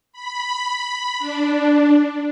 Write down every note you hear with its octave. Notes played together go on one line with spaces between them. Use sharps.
B5
D4